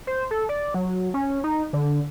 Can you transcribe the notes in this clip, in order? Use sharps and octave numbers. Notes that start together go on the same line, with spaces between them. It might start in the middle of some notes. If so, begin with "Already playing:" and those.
C5
A4
D5
F#3
C#4
D#4
D3